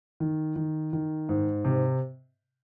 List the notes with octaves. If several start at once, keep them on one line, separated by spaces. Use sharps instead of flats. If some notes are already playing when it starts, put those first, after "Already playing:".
D#3
D#3
D#3
G#2
C3